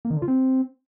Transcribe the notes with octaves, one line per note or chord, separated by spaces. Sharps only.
A#3
D#3
D3
F4
C4